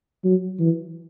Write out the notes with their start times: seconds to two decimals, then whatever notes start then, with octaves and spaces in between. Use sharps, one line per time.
0.24 F#3
0.60 E3